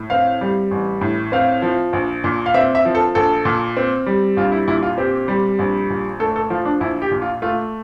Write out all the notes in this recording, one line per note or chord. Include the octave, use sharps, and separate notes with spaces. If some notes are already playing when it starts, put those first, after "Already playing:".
Already playing: A2
C4 F5
G3
A1
A2
C4 F5
F3
A#1
A#2
F5
C4 E5
E5
F3
A4
A#1 A4
A#2
C4
G3
A#1 F4
E4
A#2 E4
F4
C4 G4
G3
A#1
A#2
A3 A4
A4
F3 F4
D4
A#1 E4
G4
A#2
F4
A3 F4